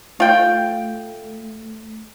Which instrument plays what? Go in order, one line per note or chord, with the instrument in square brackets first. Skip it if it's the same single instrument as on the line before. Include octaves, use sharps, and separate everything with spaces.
[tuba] A3 [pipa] F4 G5